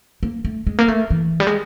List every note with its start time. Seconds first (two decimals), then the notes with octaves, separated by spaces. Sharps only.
0.23 A#3
0.45 A3
0.67 G#3
0.79 A#3
0.88 A3
1.10 E3
1.40 G3
1.47 G#3